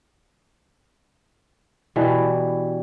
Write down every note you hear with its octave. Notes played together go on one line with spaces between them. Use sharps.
B2 E3 G3 D4